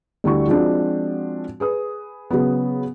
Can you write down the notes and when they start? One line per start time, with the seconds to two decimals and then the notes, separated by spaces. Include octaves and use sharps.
0.24 D2 D3 G3 E4 C#6
0.48 F3 G#3 C4 D4 F#4
1.60 G#4 B4 D#6
2.31 C#3 F#3 B3